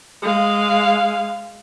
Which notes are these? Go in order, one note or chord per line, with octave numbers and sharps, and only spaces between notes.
G#3 F5